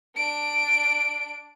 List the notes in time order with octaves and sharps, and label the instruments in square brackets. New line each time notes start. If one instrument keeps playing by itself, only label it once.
[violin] D4 D7